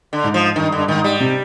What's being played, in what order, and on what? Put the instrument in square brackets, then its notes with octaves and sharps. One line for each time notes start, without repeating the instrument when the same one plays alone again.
[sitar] D3
[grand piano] G#2
[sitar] F3
[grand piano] G2 [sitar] D#3
[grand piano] G2 [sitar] D3
[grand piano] G#2 [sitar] D#3
[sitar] G3
[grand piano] C3